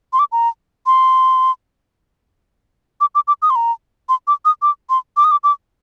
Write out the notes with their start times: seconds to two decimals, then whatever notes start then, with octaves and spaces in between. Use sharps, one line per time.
0.13 C6
0.19 D6
0.32 A#5
0.86 C6
3.01 D6
3.15 D6
3.28 D6
3.42 D#6
3.50 C6
3.56 A#5
4.09 C6
4.27 D6
4.45 D#6
4.62 D6
4.90 C6
5.17 D6
5.24 D#6
5.31 D6
5.44 D6